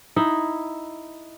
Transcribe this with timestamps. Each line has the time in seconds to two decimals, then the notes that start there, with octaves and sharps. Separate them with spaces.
0.16 D#4 E4